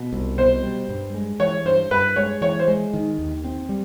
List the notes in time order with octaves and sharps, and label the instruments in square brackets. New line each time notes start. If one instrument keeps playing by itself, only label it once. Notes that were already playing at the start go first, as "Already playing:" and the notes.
Already playing: [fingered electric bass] B2
C2
[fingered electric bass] B2 [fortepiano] C5
[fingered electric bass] G3
G2
G#3
[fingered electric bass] E3 [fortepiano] C#5
[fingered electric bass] G2 [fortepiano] C5
[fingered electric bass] G2 [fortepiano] B4
[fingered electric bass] G#3 [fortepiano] C#5
[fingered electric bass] E3 [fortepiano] C#5
[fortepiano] C5
[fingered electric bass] G#3
D#3
D#2
C4
G3